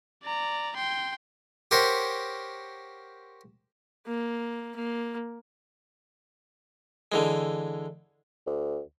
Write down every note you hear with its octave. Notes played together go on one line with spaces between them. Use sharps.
D5 A#5
G5 C6
G4 A#4 C5 C#5 F#5 B5
A#3
A#3
D3 E3 G#3
D2